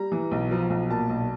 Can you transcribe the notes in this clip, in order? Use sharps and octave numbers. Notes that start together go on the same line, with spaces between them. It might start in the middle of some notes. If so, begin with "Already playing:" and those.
Already playing: G3 A#5
E3
B1
F3
B1
A#2 A5
B1